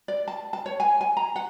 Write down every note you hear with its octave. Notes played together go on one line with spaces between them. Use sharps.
D5
A5
A5
C#5
G#5
G#5
A#5
F#5